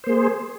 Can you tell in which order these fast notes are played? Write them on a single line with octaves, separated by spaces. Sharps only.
C5 A#3 G#4